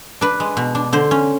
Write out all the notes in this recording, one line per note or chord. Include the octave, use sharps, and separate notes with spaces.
D4 B4
G#3
B2
D4
D3 C5
C#4